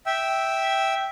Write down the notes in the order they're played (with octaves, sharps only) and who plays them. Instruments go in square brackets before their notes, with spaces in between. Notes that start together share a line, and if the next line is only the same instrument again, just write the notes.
[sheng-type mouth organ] E5 G5 E6